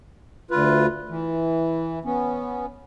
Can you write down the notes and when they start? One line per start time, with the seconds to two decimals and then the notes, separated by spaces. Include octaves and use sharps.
0.51 D2 F4 B4
1.10 E3
2.05 B3 C#4